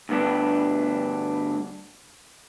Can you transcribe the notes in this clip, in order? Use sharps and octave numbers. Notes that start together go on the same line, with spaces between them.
D2 G2 B3 D4